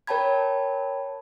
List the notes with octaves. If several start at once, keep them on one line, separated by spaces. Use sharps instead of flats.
A#4 C#5 G5 A5 B5 G#6